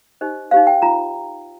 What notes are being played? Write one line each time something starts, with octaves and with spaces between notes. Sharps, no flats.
D#4 G4 C5 D#5
D#4 G4 C5 F5
G5
F4 A#5